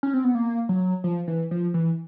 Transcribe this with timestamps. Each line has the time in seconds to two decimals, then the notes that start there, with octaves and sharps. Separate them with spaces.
0.03 C#4
0.14 C4
0.24 B3
0.35 A#3
0.69 F#3
1.04 F3
1.28 E3
1.51 F3
1.74 E3